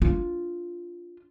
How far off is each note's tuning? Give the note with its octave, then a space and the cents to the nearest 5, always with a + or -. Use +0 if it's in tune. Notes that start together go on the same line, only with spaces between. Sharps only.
D4 -25 F4 -5